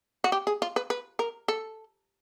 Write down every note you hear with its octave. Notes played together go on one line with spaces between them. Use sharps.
F#4
G4
G#4
F4
B4
B4
A#4
A4